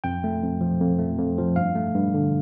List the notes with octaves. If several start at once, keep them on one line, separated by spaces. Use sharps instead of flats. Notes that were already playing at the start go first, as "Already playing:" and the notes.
F2 G5
A3
F2
F3
F2
A3
F2
F3
G2 F5
A3
G2
D3